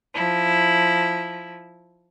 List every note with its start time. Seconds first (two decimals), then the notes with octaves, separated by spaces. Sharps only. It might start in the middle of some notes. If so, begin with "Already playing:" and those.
0.15 F3 E4